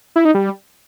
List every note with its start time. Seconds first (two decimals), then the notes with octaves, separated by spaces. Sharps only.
0.16 E4
0.25 D#4
0.34 G3